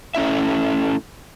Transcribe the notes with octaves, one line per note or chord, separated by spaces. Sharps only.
A3 C#4 E4 E5